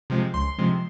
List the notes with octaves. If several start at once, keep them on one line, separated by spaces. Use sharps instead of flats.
C3 F3 G#3 C4
C#2 C6
C3 F3 G#3 C4